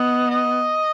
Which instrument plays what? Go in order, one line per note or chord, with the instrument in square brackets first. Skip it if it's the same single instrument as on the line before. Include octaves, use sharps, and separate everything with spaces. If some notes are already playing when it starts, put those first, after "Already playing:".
Already playing: [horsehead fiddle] B3 [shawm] D#5
[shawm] D#5